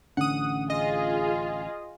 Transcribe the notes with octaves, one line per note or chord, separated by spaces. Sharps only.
A1 D3 C#4 F#5 D#6
F4 G#4 D#5